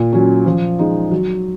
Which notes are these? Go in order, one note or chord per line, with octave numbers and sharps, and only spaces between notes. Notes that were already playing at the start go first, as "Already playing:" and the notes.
Already playing: A#2
F#3 C#4
F3
G#3 D#4 G#4
F#3